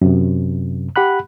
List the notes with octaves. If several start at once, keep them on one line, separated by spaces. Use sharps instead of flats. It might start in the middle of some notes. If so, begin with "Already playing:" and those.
F#2 C3
G4 F#5 B5 F#6